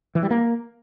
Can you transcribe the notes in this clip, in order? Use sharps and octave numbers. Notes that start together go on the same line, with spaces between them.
E3
G3
A#3